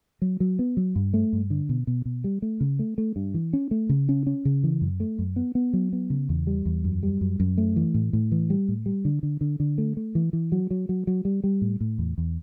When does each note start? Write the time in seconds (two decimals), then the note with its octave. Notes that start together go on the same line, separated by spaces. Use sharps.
0.22 F#3
0.40 F#3
0.59 B3
0.77 F#3
0.96 G2
1.14 A3
1.33 G2
1.50 D3
1.69 B2
1.87 B2
2.05 B2
2.24 G3
2.42 A3
2.61 C#3
2.79 A3
2.98 A3
3.16 G2
3.34 E3
3.53 C#4
3.71 A3
3.89 C#3
4.09 C#4
4.27 C#4
4.45 C#3
4.64 E3
4.81 F#2
5.00 A3
5.19 F#2
5.36 B3
5.55 B3
5.73 F#3
5.93 B3
6.10 C#3
6.29 E2
6.47 G3
6.66 E2
6.84 F#2
7.03 G3
7.21 F#2
7.40 F#2
7.58 A3
7.76 E3
7.94 A2
8.13 A2
8.32 E3
8.50 G3
8.68 A2
8.86 G3
9.05 D3
9.23 D3
9.41 D3
9.60 D3
9.78 A3
9.97 A3
10.15 E3
10.33 E3
10.52 F#3
10.71 F#3
10.89 F#3
11.07 F#3
11.25 G3
11.44 G3
11.62 A2
11.81 A2
11.98 E2
12.18 E2